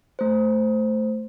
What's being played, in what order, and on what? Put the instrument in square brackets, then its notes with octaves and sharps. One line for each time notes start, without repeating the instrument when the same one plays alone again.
[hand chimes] A3 C5